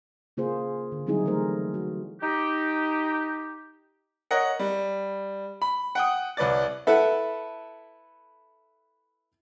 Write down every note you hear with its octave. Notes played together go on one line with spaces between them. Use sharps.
C#3 A#3 F4 G#4 C5
D3
F#3 G3 C4 D#4 E4 G#4
E3 G3 A3 E4 A#4 C5
F#4
D#4 G4
A#4 C#5 D#5 F#5
G3
B5
F#5 G5 D#6
C2 B4 C#5 D5 A6
E4 A4 B4 E5 F#5